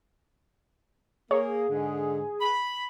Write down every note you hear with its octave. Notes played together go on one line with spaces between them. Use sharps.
A#3 G#4 C#5
G#2 D3
B5